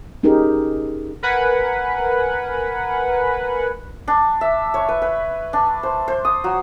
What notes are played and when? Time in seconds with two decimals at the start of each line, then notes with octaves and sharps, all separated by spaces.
0.23 C#4 D#4 G4 G#4 A#4
1.23 A#4 B4 F#5 G#5 B5
4.08 D4
4.41 E5
4.74 C#5
4.88 B4
5.02 B4
5.53 D4
5.83 C5
6.08 C5
6.25 D#6
6.44 F#3